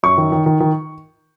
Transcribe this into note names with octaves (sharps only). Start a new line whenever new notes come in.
F#2 C#6
D#3
D#3
D#3
D#3